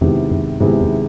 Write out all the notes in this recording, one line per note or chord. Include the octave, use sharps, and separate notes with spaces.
F2 C3 D#3 G#3 B3 E4
F#2
G#2 C3 D#3 G#3 B3 E4
E2